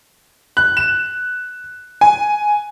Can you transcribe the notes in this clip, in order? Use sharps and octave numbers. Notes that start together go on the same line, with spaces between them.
F#6
E7
G#5